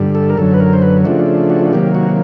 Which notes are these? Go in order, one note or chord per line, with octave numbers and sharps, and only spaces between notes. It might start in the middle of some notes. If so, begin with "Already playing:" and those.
Already playing: G2 D3 G3
A4
A#4
F#2 D3 F#3 A4
B4
A#4
C5
B4
C#3 F3 A3 D4 F#4
F#4
F#4
C3 D#3 F#3 A#3 G4
F#4